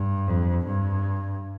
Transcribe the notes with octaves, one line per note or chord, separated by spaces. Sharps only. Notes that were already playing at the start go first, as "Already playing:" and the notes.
Already playing: G2
F2
G2